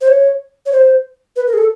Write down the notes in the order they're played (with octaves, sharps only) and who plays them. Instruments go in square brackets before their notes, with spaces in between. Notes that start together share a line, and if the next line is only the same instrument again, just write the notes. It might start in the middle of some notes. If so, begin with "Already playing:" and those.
[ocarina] C5
C#5
C#5
C5
B4
A#4
G#4
A4